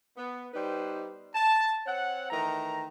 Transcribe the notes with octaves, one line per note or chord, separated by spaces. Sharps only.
B3
G3 B3 D#4 B4 C5
A5
C4 C#5 F#5
D#3 E3 A3 A#5